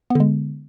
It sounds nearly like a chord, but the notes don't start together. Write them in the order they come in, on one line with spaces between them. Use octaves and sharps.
B3 D3 G#3